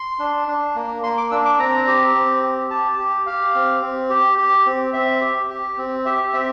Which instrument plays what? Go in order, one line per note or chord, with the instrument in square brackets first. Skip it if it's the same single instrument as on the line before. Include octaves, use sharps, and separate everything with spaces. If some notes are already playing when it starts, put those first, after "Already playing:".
Already playing: [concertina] C6
D4
D4
A#3
A#3 C6
D6
D4 E6
D6
C4 A#5
G4
C4
G4
G4 A5
G4
G4 F5
C4
C4
G4
G4
C4
C4 E5
G4
G4
C4
G4 E5
C4 E5